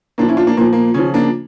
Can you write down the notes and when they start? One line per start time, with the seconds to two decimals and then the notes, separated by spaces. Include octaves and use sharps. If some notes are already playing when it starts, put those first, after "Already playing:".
0.18 A#2 A#3 D4
0.22 F3
0.28 C#4 E4
0.37 D4 F4
0.47 A#3 D4
0.57 A#2 F3 A#3
0.73 A#3
0.94 C#3 F3 C#4
1.14 A#3 D4